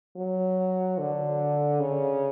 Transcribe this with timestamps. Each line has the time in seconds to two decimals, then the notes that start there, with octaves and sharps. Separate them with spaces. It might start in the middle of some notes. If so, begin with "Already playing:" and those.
0.16 F#3
0.99 D3
1.80 C#3